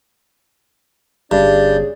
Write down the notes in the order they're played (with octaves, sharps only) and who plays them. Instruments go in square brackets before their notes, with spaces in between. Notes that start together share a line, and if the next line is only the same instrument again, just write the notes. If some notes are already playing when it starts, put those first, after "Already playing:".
[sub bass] G1 [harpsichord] G2 [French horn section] C#4 G#4 [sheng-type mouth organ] D5 G6